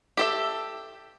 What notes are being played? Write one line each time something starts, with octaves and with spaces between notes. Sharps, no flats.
G4 A4 E5